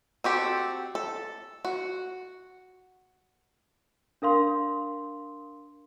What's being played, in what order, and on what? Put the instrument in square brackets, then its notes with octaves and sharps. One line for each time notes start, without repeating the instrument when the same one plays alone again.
[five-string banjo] C4 F#4 G4 A4
A4
F#4
[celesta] D4 A#4 F5 C6